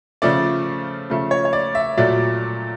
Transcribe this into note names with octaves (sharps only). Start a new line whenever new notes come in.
C#3 F3 A3 D5
C#3 F3 A3
C#5
C#5
D5
E5
A#2 F#3 A3 D5